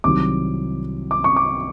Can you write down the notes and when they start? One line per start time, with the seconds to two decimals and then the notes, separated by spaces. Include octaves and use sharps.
0.04 C2 C3 D#3 F#3 D6
1.11 D6
1.24 C#6
1.36 D6